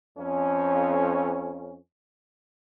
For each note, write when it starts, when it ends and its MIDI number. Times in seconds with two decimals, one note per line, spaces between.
0.18 1.77 41
0.18 1.77 61